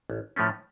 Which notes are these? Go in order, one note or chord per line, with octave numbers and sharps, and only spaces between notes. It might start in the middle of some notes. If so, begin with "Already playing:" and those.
A1
A2 F3 A3 C#4